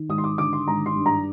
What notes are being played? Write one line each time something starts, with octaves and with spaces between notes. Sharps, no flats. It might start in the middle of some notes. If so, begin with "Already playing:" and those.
Already playing: D#3
G#1 D#6
C6
D6
D3 D6
C6
G#1 A#5
C6
G2
A#5